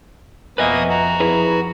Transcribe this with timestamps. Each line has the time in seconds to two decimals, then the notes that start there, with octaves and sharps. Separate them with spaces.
0.58 F2 B2 A#3 B4 D#5 E5 G#5 D#6
0.89 F#4 A#5
1.20 E4 G#4 B4